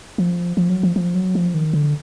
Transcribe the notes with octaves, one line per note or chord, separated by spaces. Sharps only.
F3
F3
F#3
F3
F3
F#3
F3
D#3
D3